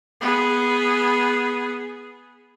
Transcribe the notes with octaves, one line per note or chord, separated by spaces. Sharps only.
B3 G#4